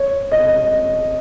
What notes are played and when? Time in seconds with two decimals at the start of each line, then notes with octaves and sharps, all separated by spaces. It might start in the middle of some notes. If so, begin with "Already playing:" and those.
Already playing: C#5
0.32 D#5